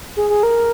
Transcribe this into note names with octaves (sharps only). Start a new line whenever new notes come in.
G#4
G#4
A#4